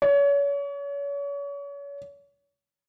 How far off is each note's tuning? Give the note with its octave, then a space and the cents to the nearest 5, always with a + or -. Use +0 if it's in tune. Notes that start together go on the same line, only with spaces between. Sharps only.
C#5 +35